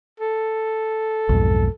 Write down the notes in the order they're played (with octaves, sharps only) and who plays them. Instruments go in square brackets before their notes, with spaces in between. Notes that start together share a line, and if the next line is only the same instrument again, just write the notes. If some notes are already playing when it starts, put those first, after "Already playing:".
[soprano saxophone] A4
[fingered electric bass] B1 F2 G#2